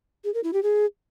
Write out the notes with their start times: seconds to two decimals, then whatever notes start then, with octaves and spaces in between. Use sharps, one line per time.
0.24 G#4
0.34 A#4
0.43 E4
0.53 G4
0.63 G#4